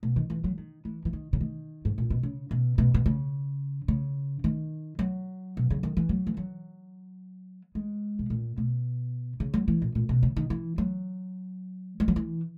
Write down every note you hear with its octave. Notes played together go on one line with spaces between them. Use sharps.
B2
D#3
E3
F#3
D#3
E3
E3
D#3
C#3
D#3
G#2
A#2
B2
C#3
B2
B2
B2
C#3
C#3
D#3
F#3
B2
C#3
D#3
E3
F#3
E3
F#3
G#3
B2
A#2
B2
C#3
F#3
E3
A#2
A#2
B2
C#3
D#3
E3
F#3
G#3
F#3
E3